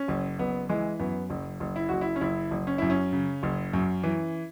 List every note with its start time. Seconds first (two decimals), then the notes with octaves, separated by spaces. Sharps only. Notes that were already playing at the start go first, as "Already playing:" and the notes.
Already playing: C#4
0.08 F#1
0.39 F#1 B3
0.69 E3 G#3
0.99 F#2 B3
1.30 F#1
1.60 F#1
1.76 E4
1.89 F#1 F#4
2.01 E4
2.16 C#4
2.21 F#1 E4
2.51 F#1
2.67 C#4
2.78 F#2 E4
2.90 C#4
3.13 C#3
3.43 F#1
3.74 F#2
4.04 E3